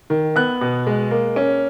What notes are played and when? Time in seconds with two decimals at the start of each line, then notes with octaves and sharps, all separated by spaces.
0.10 D#3
0.36 B3 F#6
0.61 B2
0.87 G#3
1.11 A#3
1.36 C#4